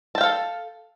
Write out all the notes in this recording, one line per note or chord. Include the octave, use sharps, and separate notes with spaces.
A4 F5 G5 A5